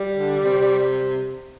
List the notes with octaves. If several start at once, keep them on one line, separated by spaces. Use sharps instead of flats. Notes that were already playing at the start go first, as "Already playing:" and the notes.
Already playing: G3
D3
C3